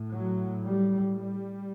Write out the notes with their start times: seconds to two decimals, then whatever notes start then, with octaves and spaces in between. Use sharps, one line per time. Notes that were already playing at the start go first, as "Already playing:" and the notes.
Already playing: A2
0.12 F#3
0.62 G3
1.14 G3